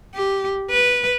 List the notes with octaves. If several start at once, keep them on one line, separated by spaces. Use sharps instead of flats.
G4
B4